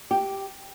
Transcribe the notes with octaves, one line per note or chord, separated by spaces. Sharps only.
G4